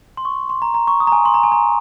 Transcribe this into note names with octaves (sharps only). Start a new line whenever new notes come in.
C6
C#6
C6
A#5
A#5
C#6
D#6
A#5
G#5
C6
A#5
G#5
A#5